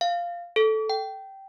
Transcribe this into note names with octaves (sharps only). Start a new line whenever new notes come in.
F5
A4
G5